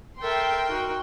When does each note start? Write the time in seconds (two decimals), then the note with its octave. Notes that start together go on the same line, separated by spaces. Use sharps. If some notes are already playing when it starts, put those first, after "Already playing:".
0.22 A4 A#4 E5 G5 C6
0.68 D#4 F#4